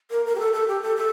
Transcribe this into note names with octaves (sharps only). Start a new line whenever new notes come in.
A#4
A#4
G4
A4
A4
G4
A4
A4